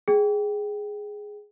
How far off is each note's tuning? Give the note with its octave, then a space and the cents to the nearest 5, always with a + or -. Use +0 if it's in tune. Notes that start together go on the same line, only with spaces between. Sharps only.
G#4 +0 G5 -10